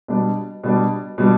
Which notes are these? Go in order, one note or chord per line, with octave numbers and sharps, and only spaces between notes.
B2 G3 D4
B2 G3 D4
B2 G3 D4